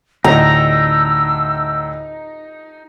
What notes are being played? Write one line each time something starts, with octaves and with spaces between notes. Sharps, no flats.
D2 A2 D#4 A#5 E6